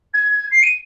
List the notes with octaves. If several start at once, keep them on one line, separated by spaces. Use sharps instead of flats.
G#6
C7
D#7